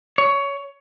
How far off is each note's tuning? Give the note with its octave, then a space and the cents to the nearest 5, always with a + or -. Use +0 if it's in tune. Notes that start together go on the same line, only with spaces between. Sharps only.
C#5 +15